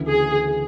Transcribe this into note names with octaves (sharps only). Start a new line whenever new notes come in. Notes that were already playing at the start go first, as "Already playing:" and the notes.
Already playing: D2 C#3 E3
G#4